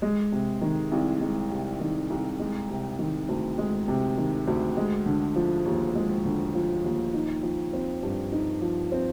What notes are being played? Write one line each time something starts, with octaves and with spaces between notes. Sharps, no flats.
G#3
C3
D#3
C2
G#3
C3
D#3
C2
G#3
C3
D#3
D2
G#3
C3
D#3
D2
G#3
D3
F3
D#2
G#3
D3
F3
D#2
D#4
F3
C4
G2
D#4
F3
C4